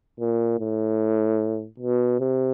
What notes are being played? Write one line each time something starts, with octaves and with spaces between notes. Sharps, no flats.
A#2
A2
B2
C3